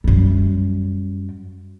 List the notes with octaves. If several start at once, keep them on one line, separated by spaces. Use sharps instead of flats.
F#2 G3